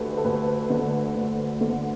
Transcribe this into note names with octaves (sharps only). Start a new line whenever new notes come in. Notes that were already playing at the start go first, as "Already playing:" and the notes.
Already playing: D2 D3 A3 G4 A4 B4
A4
D2 B4
D3 A3
D2
D3 A3